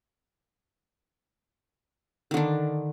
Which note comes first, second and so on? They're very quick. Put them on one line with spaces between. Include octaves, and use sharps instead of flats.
D#3 D3 D4